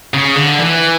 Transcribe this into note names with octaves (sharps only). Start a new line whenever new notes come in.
C#3
D3
E3